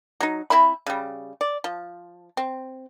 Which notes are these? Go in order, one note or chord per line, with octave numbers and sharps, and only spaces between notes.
F#3 D#4
C4 E4 E5 B5
C#3 G3
D5
F3
C4